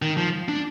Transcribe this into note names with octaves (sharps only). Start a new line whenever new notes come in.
D#3
F3
D4